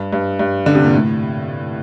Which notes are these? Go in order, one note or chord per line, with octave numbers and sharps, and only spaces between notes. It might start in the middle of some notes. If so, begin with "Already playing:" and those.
Already playing: G2
G2
G2
D3
C3
A#2
A2